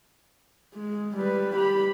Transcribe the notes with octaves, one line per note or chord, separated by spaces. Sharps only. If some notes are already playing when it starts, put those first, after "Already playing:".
G#3
G3 B4
G4 B5